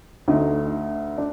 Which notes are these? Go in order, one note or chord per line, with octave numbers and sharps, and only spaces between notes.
D2 D3 A3 D#4
D4